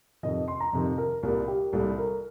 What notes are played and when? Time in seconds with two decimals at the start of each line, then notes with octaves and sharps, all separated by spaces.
0.23 F2 C3 D#3 D#5
0.48 C6
0.60 A#5
0.73 F2 C3 D#3
0.98 A#4
1.23 C2 A#2 G3 A#4
1.48 G4
1.73 C2 A#2 G3 A4
1.97 A#4